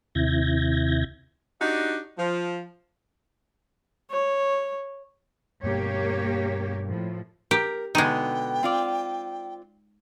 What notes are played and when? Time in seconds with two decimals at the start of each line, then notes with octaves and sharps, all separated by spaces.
0.15 D#2 C3 E4 G6 G#6 A#6
1.61 D4 D#4 F#4 G4 D5 D#5
2.18 F3
4.11 C#5
5.64 G2 B2 A#3 G4 C#5
6.88 A2 F3
7.51 G4 A#4
7.95 B2 D3 G#3 B3 D#4 G5
8.63 C4 F4 D5